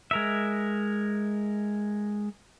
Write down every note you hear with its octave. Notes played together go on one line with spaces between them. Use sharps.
G#3 A#4 E5